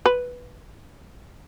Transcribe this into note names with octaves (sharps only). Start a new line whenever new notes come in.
B4